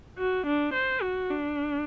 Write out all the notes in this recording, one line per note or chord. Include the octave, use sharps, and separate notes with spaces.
F#4
D4
C5
F#4
D4